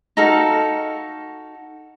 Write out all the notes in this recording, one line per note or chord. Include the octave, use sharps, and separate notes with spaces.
D#4 F#4 A4 F5